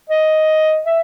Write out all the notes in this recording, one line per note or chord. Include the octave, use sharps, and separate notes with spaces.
D#5
E5